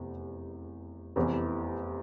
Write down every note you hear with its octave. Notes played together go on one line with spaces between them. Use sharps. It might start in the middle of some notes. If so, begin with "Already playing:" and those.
Already playing: F1 E2 C3
F1 E2 C3 E3